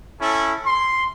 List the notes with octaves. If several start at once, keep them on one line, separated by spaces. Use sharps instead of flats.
C#4 E4 A4
C6